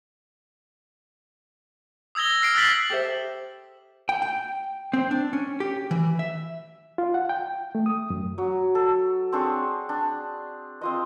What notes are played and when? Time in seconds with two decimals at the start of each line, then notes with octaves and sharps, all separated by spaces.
2.15 D#6 E6 G#6 A#6 G7
2.42 F6 C7 D7
2.55 E6 F#6 A6 B6 F#7
2.90 G4 A4 C5 E5
4.09 G5
4.22 G5
4.93 C4
5.11 D4
5.33 C#4
5.60 G4
5.91 E3
6.19 E5
6.98 F4
7.14 F#5
7.29 G5
7.75 A3
7.86 D#6
8.10 F#2
8.38 F#3
8.75 A4
9.32 C4 D4 G#4 C#5
9.89 D4
10.81 C4 F4 D#5